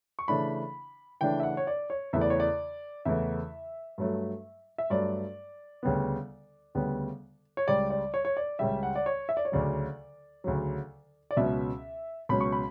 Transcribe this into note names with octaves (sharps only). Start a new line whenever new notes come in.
C#6
C#3 E3 A3 D4 B5
C#3 E3 A3 D4 G5
E5
F#5
C#5
D5
C#5
E2 C#3 E3 A3 E5
D5
C#5
D5
E2 C#3 E3 A3 E5
G2 F#3 A3
E5
G2 F#3 A3 D5
D2 C#3 G3 B3
D2 C#3 G3 B3
C#5
C#2 C#3 G3 D5
D5
C#5
C#5
D5
C#2 C#3 G3 E5
F#5
D5
C#5
E5
D5
C#5
D2 C#3 F#3 D5
D2 C#3 F#3
D5
C#2 B2 F#3 C#4 E5
C#2 B2 F#3 C#4 B5
C#6
B5